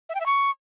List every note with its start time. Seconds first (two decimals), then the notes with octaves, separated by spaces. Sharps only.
0.09 E5
0.15 G5
0.20 E5
0.26 C#6